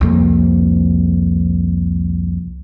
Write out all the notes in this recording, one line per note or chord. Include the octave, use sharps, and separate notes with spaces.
C2 F2 A#3